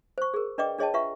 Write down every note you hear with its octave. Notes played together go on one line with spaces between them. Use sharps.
C5 C#6
G#4 A#4
D4 B4 D5 D#5 G5 D6
D4 G#4 C#5 D#5 G5 A5
F4 B4 E5 F#5 C#6